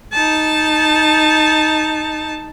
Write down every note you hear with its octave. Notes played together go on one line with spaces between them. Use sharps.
D#4 A5